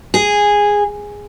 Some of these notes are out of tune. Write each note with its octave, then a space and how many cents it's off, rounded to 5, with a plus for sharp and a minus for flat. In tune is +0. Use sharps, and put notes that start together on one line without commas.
G#4 -10